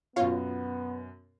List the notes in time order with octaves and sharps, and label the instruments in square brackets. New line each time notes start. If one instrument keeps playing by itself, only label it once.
[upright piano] F#2 B2 [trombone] B3 [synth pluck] F4 C#5 F5